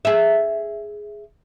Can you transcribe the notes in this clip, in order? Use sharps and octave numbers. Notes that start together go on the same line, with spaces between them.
G#4 E5